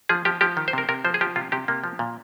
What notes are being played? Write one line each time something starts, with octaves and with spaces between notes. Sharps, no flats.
F3 G#4
F3 G4
F3 G4
D#3
C5
C3 A#4
C3 A#4
F3 C5
G#4
F3 G4
C3 F4
C3 G4
C3 A#3
F3
A#2